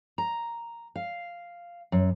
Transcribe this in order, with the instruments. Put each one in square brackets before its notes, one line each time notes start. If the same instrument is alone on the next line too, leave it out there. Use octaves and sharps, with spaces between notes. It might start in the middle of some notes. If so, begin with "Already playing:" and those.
[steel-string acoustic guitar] A#5
F5
F#2